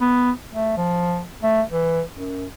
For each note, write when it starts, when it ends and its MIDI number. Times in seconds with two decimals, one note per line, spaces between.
0.01 0.32 59
0.51 0.75 57
0.77 1.23 53
1.43 1.62 57
1.70 2.02 52
2.13 2.46 42